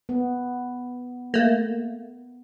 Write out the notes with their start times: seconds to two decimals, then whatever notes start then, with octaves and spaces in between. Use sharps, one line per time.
0.09 B3
1.34 A3 A#3